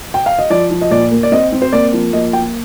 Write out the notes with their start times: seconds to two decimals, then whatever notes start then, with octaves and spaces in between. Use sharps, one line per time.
0.14 G5
0.26 F5
0.39 D#5
0.50 F3 D5
0.71 F3
0.81 D#5
0.91 A#2 D5
1.11 A#3
1.23 D5
1.32 C4 D#5
1.52 C4
1.62 C5
1.73 A#3 D5
1.93 F3
2.13 A#3 D#5
2.33 A#3 G5